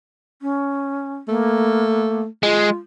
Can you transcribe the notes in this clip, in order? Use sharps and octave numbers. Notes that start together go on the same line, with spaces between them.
C#4
A3 A#3
G#3 F4